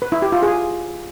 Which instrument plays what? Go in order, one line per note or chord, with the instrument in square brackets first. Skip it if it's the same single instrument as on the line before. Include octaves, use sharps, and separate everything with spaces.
[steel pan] B4
E4
G4
F4
G#4